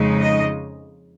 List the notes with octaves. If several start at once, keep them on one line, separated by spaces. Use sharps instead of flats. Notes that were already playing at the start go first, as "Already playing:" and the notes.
Already playing: F2 C#3 G#3 D#4
D#5